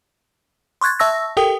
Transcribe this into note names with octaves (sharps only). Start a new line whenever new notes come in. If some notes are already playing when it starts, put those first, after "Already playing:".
C6 C#6 F#6 G#6 A6
E5 A5 C#6 E6 A#6
G4 A4 A#4 G5 D#6